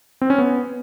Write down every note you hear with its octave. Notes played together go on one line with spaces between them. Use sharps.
C4
C#4
B3